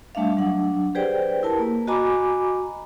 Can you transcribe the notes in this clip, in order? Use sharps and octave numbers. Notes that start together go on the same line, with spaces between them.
G3 A3 D4 E5 F5
F#3 D4 F#5
G4 G#4 B4 C5 D5 G5
E4 A#4 B4 A5
A#3
F#4 D#5 G#5 A#5 B5 D6